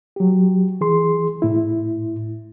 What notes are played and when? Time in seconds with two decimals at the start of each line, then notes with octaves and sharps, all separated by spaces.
0.16 F#3 G4
0.81 E3 G#4 C6
1.42 A2 E4